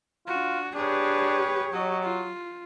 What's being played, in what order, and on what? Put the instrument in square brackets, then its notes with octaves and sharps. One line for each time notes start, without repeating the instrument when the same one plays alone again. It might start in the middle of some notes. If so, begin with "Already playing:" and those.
[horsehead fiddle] D4 F#4 [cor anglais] F4
[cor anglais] D4 [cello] G4 C#5 [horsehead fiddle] G#4 B4
[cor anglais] F#3 [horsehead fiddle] D#5
[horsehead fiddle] F4